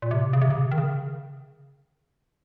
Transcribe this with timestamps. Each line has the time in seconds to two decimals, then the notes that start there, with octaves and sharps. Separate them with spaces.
0.02 A#2
0.11 C3
0.33 C#3
0.41 C3
0.50 C#3
0.71 D#3
0.78 C#3